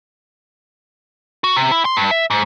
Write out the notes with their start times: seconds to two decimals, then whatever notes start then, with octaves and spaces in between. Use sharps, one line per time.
1.44 F#4
1.56 C3
1.71 E4
1.85 C6
1.97 G2
2.11 E5
2.30 G#2